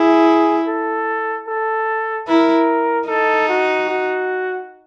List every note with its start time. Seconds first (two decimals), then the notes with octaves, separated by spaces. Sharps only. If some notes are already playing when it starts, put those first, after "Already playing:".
Already playing: E4 G#4
0.67 A4
1.48 A4
2.28 E4 A#4
3.08 D#4 A4
3.49 F#4
3.89 F#4